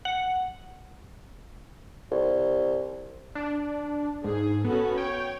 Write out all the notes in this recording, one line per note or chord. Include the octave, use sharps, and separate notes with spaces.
F#5
C2
D4
G#2 G#4
B3 C#4 F#4 A4
C#5 G5